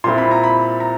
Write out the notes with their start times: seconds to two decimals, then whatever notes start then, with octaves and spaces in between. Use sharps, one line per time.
0.04 A#2 G3 C4 E4 C6
0.18 B5
0.31 A#5
0.44 B5
0.80 A#5